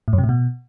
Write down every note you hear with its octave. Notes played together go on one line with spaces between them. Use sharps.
A2
F#2
C3
A2
B2